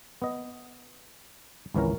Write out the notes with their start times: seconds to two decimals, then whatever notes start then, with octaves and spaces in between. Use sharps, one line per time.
0.22 B3 D#5
1.74 G#1 C#2 E3 C#4 A#4